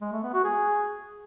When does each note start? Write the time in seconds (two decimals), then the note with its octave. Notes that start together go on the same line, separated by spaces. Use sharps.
0.01 G#3
0.12 A3
0.23 B3
0.34 F#4
0.44 G#4